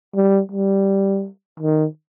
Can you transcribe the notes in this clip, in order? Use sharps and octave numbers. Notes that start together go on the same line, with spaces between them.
G3
G3
D#3